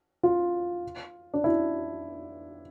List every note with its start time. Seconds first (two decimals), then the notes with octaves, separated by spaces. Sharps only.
0.23 F4
1.34 D4
1.44 E4